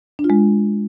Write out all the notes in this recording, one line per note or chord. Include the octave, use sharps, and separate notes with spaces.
D4
F4
G#3